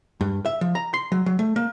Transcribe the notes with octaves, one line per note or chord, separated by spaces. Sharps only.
G2
E5
F3
A#5
C6
F#3
F#3
A3
A#3